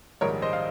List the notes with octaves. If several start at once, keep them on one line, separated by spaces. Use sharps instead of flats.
A#1 G#2 D#3 G3 A#4 C#5
C5 D#5
F5